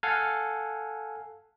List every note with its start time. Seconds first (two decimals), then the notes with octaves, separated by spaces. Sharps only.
0.03 A4 F5 F#5 G#5